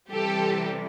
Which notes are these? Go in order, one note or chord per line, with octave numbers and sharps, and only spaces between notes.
C3 E3 G3 G4 A4